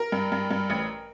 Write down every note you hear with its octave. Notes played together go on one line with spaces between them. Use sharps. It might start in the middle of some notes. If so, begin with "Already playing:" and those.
Already playing: A#4
G2
G2
G2
A1